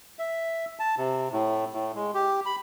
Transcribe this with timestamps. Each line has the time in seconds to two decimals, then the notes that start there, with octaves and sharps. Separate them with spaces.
0.19 E5
0.79 A5
0.98 C3
1.32 A2
1.73 A2
1.95 G#3
2.14 G4
2.46 B5